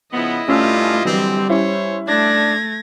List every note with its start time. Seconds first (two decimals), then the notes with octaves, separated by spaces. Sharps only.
0.12 C#3 F3 B3 E4 D#5
0.48 G2 G3 A3 C#4 F4 E6 F6
1.05 D3 E3 F#3 G3 C4
1.49 C#4 E4 C5 C#5
2.08 A3 D4 G#6 A#6